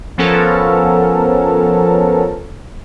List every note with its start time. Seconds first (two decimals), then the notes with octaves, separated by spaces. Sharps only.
0.18 F3 B3 C#4 A4 A#4